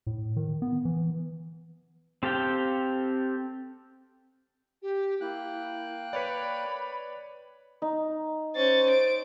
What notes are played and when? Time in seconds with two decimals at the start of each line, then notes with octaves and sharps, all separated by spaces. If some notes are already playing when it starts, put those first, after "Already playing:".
0.07 A2
0.36 D#3
0.62 B3
0.85 E3
2.23 C4 G4 A4 F5 G5
4.82 G4
5.21 A#3 E4 G5 F#6
6.13 B4 C#5 D5 B5
7.82 D#4
8.55 C#4 C5 A6
8.90 D7